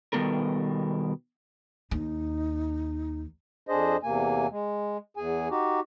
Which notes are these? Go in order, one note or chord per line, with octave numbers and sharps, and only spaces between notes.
B2 D#3 G3 B3 A4 A#4
D#2 D#4
F2 D4 G#4 C5 D#5
E2 C3 A#3 G#5
G#3
E2 G#4 G#5
D#4 F#4 G4